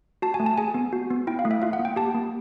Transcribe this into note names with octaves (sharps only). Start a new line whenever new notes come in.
F#4 A5
G#5
A3
A5
G#4 G#5
B3
F#4
B3
E4 G5
F5
A3
E5
F4 F5
F#5
A#3
G5
G4 A5
A#3